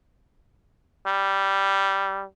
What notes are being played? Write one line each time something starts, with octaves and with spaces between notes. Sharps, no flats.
G3